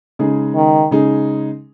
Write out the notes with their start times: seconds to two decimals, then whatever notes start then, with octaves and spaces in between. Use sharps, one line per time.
0.19 C#3 G#3 D#4 G#4
0.55 D#3
0.91 C#3 G#3 D#4 G#4